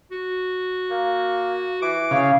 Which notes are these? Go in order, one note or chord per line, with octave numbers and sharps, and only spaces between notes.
F#4
A#3
E3 D6
C#3 F5